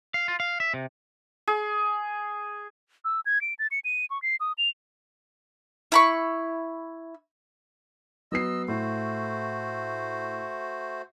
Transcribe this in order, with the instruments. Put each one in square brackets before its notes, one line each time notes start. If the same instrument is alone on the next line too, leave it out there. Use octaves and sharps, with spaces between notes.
[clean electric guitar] F5
F4
F5
E5
C3
[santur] G#4
[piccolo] E6
G#6
D7
A6
C#7
D#7
C#6
C7
D#6
F7
[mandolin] E4 B5 C#6
[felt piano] F#3 B3 C7 [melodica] D#5 E6
[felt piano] A2 [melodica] A3 F#4 C5